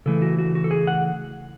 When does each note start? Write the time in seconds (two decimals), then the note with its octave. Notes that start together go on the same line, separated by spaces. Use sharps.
0.06 C#3 E3 A3 A4
0.22 F#4
0.38 F#4
0.55 F#4
0.64 A4
0.71 G#4
0.87 F#5